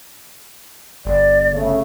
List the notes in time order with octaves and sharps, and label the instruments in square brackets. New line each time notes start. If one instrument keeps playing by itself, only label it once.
[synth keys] G1 [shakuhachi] D5
[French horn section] C#3 A3